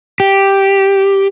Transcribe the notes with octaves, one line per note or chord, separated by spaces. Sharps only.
G4